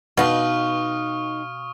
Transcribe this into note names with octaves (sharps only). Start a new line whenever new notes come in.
B2 D#4 B4 F5 C#6 D#6 F6